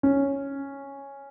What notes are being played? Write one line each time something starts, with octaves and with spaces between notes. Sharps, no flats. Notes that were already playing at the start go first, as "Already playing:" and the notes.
C#4